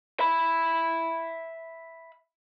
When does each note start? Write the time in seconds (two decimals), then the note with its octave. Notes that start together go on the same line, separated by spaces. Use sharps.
0.20 E5 B5